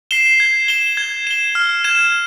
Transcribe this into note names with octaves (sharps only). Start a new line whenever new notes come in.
C7 E7 G7
G#6
E7 G7
G#6
E7 G7
F6
G#6 E7